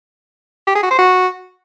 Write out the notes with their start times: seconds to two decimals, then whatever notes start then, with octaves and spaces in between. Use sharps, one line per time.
0.67 G4
0.75 G#4
0.83 F#4
0.91 C5
0.99 F#4